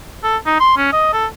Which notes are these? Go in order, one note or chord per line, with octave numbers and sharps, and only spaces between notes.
A4
D#4
C6
C#4
D#5
A4